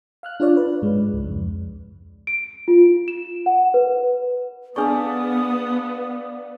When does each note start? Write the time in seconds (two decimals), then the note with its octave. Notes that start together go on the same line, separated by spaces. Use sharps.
0.23 F5 F6 F#6
0.40 D4 F4 C#5 D5
0.57 B4
0.82 G#2 G#3
1.13 C#2
1.27 F2
2.27 D7
2.68 F4
3.08 E7
3.46 F#5
3.74 B4
4.76 B3 D4 G#4 D5 F5 A5 C#6 D#6